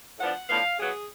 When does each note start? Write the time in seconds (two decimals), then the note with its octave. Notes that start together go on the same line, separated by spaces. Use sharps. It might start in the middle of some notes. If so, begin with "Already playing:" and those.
0.18 A2 F3 B3 D4 F#5
0.47 A2 F3 B3 D4 F5
0.77 C#3 F#3 B3 G#4